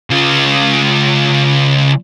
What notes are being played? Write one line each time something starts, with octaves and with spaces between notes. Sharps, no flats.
C#3 F4